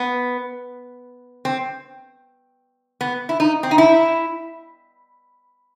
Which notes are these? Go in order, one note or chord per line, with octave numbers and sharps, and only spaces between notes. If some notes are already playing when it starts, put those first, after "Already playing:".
Already playing: B3
C4
B3
E4
D#4
C4
D#4
E4